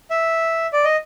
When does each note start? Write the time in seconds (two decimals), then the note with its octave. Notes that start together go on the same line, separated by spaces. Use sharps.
0.10 E5
0.73 D5
0.85 D#5